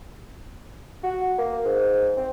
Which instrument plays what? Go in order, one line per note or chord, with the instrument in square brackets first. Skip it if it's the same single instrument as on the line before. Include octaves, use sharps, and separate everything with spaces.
[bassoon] F#4
A#3
G#2
C4